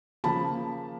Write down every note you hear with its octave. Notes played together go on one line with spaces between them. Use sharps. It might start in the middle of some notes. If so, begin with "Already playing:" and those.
C#3 F3 A#3 A5 B5